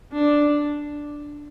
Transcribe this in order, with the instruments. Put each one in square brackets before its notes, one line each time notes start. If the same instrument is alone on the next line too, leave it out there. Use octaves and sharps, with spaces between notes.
[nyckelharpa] D4